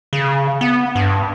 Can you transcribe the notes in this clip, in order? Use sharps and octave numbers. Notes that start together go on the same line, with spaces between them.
C#3
B3
G2